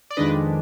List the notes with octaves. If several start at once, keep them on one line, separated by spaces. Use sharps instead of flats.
D5
F2 D#3 G#3 D4 B4 D#5